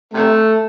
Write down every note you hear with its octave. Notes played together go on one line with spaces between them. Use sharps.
C3 A3